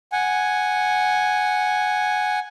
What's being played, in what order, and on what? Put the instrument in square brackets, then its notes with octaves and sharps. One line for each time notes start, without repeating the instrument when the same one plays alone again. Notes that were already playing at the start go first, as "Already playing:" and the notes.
[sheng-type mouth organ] F#5 G#5